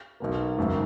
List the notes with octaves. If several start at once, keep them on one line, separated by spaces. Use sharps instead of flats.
B1 B2 A#3
G#1 F#2 C#3